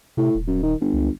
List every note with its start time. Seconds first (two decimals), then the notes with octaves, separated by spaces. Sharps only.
0.17 A2 C3
0.35 D#1
0.48 F#2
0.63 D#3
0.81 G1
0.93 C#2